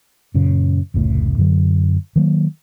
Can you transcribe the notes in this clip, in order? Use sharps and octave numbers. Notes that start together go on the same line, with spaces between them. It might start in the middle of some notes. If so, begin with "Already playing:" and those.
F#2 A#2 C#3
F1 C#2 A2 A3
F#2 D3 F#3
D#3 F#3 A#3